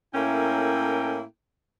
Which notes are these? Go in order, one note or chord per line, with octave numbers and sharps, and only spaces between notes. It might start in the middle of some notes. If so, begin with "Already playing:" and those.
A2 A#3 C#4 E4 A4 A#4 G5